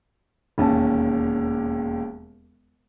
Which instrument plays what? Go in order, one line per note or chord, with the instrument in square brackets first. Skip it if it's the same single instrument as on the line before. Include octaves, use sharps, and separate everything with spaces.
[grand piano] E1 D#2 C#4 A5